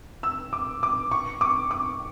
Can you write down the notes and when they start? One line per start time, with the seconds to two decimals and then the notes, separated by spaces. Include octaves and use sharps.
0.23 E6
0.53 D6
0.83 D6
1.11 C#6
1.41 D6
1.71 D6